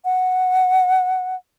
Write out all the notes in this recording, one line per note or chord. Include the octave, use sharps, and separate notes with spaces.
F#5